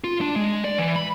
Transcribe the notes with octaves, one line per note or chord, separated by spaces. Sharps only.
F4
D4
G#3
D5
E3
B5